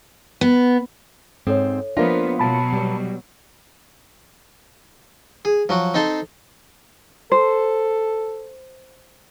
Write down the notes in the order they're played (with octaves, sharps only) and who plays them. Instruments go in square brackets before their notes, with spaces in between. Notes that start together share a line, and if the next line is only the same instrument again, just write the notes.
[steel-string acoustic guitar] B3
[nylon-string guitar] G#2 C4 [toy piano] A4 C#5
[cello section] F3 B3 [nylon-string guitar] A#3 F4 [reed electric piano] D4 A#4 C5 [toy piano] E5
[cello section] B2 F#3 [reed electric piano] A5 B5
[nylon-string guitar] G3
[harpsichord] G#4
F3 F#3 F#4
C4 D#4 A4 A5 C6
[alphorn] A4 [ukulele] C5